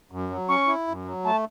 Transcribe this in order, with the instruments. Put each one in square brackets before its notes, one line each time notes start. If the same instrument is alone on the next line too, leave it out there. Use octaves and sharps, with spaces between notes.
[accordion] F#2
F#3
[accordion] C#4 [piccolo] C#6
[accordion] E4
F#2
F#3
[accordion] A3 [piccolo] A5